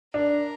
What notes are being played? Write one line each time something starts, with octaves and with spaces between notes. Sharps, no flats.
D4 A#4